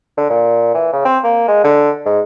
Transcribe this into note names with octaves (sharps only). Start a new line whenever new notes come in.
D3
A#2
E3
C#3
C4
A#3
G#3
D3
G#2